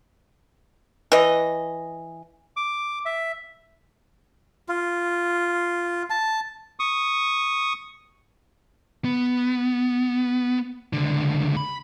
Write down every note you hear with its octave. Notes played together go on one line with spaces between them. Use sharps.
E3 D#5
D6
E5
F4
A5
C#6 D#6
B3
C#2 D3
B5